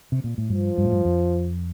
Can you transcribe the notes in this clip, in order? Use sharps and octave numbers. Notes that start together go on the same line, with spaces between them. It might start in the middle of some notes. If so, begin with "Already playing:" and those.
C3
A#2
A2
G2 F3
G2
A2
G2
F2